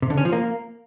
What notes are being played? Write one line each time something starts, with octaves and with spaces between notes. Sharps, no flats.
C3
D3
C#4
F3
A#3